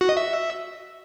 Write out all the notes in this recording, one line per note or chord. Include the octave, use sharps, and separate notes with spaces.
F#4
D#5
E5